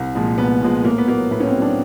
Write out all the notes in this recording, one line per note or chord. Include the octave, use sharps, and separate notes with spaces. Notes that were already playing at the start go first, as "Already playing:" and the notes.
Already playing: C2
A#2 F3 G#3
C2 B3
A#2 F3 G#3
A2 A#3
B3
F#3 A#3
A2 B3
C#4
C4
F#3
D4